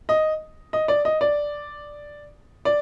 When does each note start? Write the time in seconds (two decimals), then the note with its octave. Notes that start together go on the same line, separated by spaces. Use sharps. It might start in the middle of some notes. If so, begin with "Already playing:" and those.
0.09 D#5
0.73 D#5
0.88 D5
1.05 D#5
1.21 D5
2.65 D5